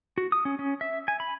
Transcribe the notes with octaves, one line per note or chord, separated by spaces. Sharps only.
F#4
D#6
C#4
C#4
E5
G#5
B5